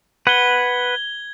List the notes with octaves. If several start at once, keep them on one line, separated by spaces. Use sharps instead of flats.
B4 F#5 G#6 G7